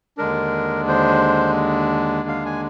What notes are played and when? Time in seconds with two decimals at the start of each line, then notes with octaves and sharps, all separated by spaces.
0.18 D#2 D3 G#3 D4 A#4
0.88 C5
2.28 F5
2.46 G#5